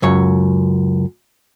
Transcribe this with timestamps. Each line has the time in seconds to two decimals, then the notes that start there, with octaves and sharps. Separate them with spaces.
0.02 C#2 F#2 C#5